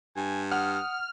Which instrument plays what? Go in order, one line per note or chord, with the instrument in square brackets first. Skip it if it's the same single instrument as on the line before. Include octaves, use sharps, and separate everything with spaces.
[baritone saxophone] G2 [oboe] G#5
[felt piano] F#5 [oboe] D#6 [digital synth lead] F6